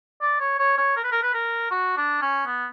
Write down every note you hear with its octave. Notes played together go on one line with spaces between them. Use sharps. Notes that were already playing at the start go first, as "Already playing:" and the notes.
D5
C#5
C#5
C#5
A#4
B4
A#4
B4
A#4
F#4
D4
C#4
B3